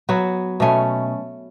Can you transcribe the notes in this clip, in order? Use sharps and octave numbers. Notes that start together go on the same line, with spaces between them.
F#3 B3 F#4
B2 A3 C#4